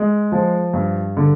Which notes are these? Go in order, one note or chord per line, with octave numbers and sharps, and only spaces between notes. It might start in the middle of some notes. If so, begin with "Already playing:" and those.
Already playing: G#3
F3
G2
D3